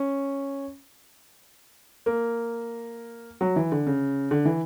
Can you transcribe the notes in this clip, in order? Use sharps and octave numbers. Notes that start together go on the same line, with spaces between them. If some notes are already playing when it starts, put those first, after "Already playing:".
Already playing: C#4
A#3
F#3
E3
D3
C#3
D3
E3